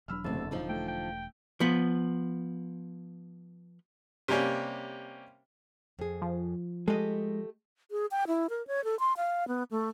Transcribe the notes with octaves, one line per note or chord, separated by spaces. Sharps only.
E1 F#3 D4 B5 E6 F6
F#1 D2 C3 A4
D3 F3 D#4
A3 G5
G5
F3 B3
C3 G3 A#3 C#4 G4
F2 G#4
F3
G#3 A3 G4 A4 D#5
G#4
G5
E4
A#4
C#5
A4
C6
F5
B3
A3